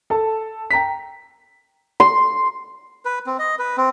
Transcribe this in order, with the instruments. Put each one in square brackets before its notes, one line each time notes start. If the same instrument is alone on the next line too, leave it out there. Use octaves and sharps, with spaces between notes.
[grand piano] A4 A5
G5 A#5 B6
[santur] C6
[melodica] B4
C4
D#5
B4
C4